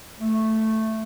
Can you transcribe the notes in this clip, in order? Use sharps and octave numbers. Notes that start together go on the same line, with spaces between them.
A3